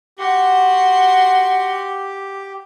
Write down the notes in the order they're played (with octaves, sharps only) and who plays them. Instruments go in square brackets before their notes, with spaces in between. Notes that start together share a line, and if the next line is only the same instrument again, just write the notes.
[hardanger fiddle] F#4 C6 [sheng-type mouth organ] G4